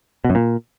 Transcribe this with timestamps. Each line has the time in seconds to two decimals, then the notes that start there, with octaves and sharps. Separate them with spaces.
0.24 B2
0.30 F#2
0.35 A#2